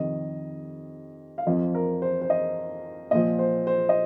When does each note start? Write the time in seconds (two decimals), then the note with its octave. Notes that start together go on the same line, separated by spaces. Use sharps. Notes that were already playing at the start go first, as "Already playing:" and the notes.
Already playing: F2 C3 D#3 D#5
1.38 F5
1.47 F2 F3 D#5
1.75 A#4
2.02 C5
2.22 C5
2.30 D#5
3.11 A#2 F3 D#5
3.39 C5
3.67 C5
3.89 D#5